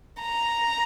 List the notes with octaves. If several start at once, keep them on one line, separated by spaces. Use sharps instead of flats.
A#5